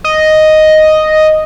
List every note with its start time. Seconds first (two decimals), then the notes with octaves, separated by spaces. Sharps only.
0.04 D#5